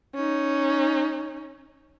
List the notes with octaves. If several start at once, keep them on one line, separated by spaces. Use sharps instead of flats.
C#4 D#4